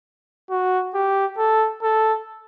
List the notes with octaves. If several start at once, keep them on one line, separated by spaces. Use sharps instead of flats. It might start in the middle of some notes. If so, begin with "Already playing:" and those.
F#4
G4
A4
A4